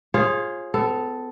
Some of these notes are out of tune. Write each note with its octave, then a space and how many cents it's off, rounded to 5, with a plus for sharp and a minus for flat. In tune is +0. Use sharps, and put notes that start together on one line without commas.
F4 +5 G#4 +0 C#5 -45
B3 +40 A4 +0